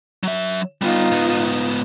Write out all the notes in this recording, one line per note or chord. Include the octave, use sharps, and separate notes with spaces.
F#3 E5
G3 B3 D#4 F4
G#2 B3